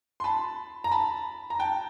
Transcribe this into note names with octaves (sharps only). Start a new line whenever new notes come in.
C6
A5 B5
A#5
A5 B5
A#5
G5 A5